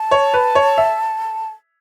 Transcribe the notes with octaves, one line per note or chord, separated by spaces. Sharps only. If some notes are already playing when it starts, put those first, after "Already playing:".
Already playing: A5
C#5
B4
C#5
E5